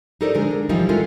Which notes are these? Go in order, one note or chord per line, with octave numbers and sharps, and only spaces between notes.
D#4 G4 A4 A#4 C5 D5
D3 F3 G#3 D4 A#4
D4
C3 E3 F3 G3 D#4
G#3 C#4 E4 F4 A4 A#4